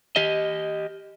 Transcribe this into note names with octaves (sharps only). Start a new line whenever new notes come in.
G4 D#5